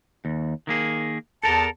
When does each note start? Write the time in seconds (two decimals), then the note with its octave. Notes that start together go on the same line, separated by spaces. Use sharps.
0.25 D#2
0.67 D#3 A#3 G#4
1.43 E2 A4 A#4 A5